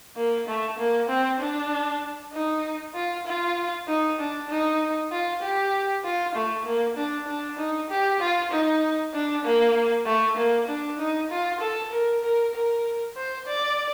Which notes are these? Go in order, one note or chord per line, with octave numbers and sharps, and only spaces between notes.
A#3
A3
A#3
C4
D4
D#4
F4
F4
D#4
D4
D#4
F4
G4
F4
A3
A#3
D4
D4
D#4
G4
F4
D#4
D4
A#3
A3
A#3
D4
D#4
F4
A4
A#4
A#4
A#4
C5
D5